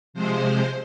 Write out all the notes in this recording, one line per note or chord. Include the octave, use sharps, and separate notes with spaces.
C3 F3 G#3 C5